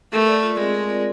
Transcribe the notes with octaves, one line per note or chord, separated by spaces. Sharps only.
A3 A#4
D5
F4
G#3 C4
A#4
D5